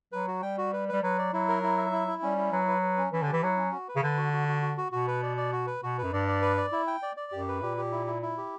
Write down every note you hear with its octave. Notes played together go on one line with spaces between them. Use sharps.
F#3 B4
F#4
G3 G5
F#4
B4
G3 B4
F#3 B4
D5
F#3 E4
A#4
E4
E5
E4
E4
G3 C#4
E4
F#3 B4
B4
B4
C#4
E3 C#4
D3
G4
E3
F#3 E4
C#4
F#4
B4
C#3
D3 B4
F#4
F#4
F#4
F#4
F#4
B2 F#4
B4
D5
D5
F#4
B4
B2 F#4
F#2 B4
G2 D5
D5
B4
D5
E4
G5
D5
D5
F#2 G4
B4
A#2 G4
G4
E4
E4
E4
G4